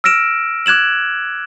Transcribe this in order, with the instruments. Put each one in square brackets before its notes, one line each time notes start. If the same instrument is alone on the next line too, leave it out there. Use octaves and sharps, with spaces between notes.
[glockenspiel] E6 F6 A#6 D7 E7
D6 F#6 G#6 E7 F#7